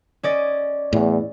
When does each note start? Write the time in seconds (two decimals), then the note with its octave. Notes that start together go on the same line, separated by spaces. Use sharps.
0.23 C#4 D5 D#5
0.93 E2 A2